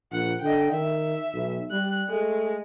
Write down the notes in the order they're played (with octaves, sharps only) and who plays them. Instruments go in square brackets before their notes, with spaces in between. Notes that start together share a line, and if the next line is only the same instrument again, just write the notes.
[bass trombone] A#1 [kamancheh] F#5
[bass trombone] D3 [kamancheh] D#5 G5
[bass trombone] D#3 [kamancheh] E5
[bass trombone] B1
[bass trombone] G3 [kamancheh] F#6
[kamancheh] G#3 [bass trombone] A3